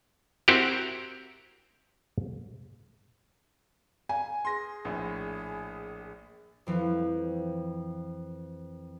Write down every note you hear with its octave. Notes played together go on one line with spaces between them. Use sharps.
C4 E4 F#4 G4 A#4
G#5
G#4 C6 A#6
A#1 A2
F2 E3 F3